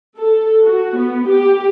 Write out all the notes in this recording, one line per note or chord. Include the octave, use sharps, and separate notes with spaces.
A4
F#4
B3
G4